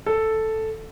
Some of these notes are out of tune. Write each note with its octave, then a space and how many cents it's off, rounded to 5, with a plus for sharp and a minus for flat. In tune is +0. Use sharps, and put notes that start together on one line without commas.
A4 +0